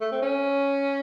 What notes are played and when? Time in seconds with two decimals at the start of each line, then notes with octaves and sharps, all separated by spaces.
0.01 A3
0.12 C4
0.23 C#4